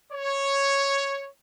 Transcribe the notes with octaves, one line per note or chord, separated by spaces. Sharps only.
C#5